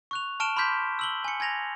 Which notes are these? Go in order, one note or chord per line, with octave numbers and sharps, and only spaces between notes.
C#6 F#6 F7
A5 C#6 F6 D7 E7 G7
B5 C6 D6 F6 G6 B6
E6 F#7 G7
G#5 C#7
G#5 G#6 A#6 F7